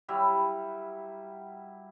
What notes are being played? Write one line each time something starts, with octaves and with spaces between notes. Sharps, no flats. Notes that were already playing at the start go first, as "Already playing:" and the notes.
F#3 G3 E4